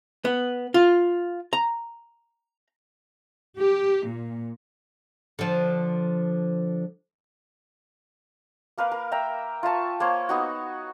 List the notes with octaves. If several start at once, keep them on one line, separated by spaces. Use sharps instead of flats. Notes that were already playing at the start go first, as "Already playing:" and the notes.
B3
F4
A#5
G4
A#2
D3 F3
A#3 A#4 B4 F5
A#4
E5 G5 A#5
F4 E5 A5 C#6
A#3 C5 C#5
B3 D#4 F#4